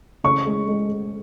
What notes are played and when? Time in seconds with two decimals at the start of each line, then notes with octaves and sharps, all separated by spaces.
0.24 C#3 C#6
0.46 G#3
0.68 G#3